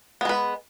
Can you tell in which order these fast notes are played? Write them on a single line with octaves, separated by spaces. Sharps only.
B3 G#3 B4